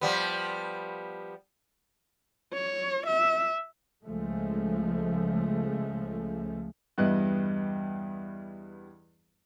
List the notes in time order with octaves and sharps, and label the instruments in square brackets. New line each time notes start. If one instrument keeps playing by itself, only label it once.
[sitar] F3 G3 B3
[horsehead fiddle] C#5
E5
[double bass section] C#2 F3 G#3 A3
[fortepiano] E2 G2 G3 B3 D#5 F#6